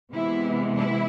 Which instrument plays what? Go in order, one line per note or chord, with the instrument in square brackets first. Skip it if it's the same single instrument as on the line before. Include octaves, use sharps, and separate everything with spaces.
[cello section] C3 E3 G#3 B3 E4
E4